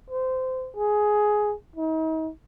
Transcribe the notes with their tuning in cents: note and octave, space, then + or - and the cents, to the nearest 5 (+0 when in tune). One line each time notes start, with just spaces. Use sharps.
C5 -20
G#4 +10
D#4 +40